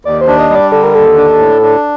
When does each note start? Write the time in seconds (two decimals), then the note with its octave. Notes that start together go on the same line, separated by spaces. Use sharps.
0.05 D#2 D5
0.21 C5
0.27 D4
0.38 D#5
0.49 G3 D#5
0.55 D5
0.72 D3 A4
0.83 A#4
0.95 D#2 A4
1.17 D4
1.39 A2
1.62 D4